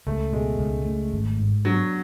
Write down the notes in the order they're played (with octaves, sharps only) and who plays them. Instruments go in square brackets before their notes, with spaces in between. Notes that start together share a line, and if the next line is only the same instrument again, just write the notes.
[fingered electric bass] C#2 [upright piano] A3
[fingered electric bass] B2 [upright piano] G#3
[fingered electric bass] C#2
A3
G#1
G#2
[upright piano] F#3 [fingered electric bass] D4